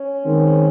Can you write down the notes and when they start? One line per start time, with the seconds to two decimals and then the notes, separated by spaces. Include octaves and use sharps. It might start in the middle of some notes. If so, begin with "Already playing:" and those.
Already playing: C#4
0.25 D#3 G#3 C4